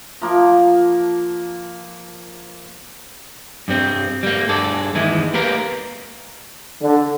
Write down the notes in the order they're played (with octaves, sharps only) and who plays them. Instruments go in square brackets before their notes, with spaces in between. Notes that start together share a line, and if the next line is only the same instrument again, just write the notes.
[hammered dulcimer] F3 A#3
[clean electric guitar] G2 G3 C4
G3 A#3
G2 G#4 A4 D5
D#2 E3 G#3 E4
A#3 G4 A#4 B4 F5 A#5
[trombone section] D3